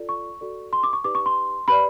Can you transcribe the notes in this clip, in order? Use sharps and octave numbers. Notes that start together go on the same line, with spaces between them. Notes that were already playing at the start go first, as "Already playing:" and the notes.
Already playing: F4 A4 D5
C#6
F#4 A4 D5
C6
D6
C#6
D#4 G4 B4 D5 D6
C#6
C6
G4 B4 D5 B5